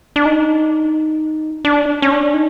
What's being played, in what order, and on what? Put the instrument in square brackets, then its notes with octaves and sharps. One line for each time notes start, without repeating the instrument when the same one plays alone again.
[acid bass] D4
D#4
D4
C#4
D4
D#4